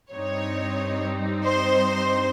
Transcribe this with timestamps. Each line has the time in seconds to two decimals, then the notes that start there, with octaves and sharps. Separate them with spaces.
0.12 G2 G3 C4 D#4 C#5
1.44 C5